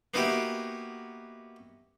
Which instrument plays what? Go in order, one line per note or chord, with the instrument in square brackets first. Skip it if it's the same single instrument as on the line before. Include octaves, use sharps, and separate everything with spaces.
[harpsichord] A#3 B3 D#4 E4 F#4 G4